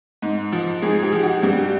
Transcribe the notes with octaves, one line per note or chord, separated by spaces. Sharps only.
G#2
F3
G#2 G#4
G4
F3
F#4
G2 G4